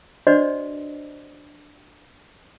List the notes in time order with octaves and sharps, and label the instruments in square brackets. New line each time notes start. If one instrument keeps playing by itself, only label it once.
[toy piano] D4 F#4 B4 C5 D5 D#5